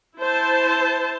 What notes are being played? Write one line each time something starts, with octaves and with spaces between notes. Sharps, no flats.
E4 C5 A5